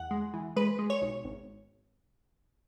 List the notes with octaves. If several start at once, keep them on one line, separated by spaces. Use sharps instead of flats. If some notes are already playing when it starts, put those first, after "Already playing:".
Already playing: E2 F#5
G#3
E3
G#3 B4
G#3
C#5
B1
G#1